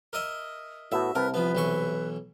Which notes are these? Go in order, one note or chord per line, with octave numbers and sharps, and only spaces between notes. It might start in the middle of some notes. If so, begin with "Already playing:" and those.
A#4 D#5 E5
A2 B3 F#4 A4 E5
C2 C3 A#4 B4 A5
F3 B3 B4
B1 E3 C#6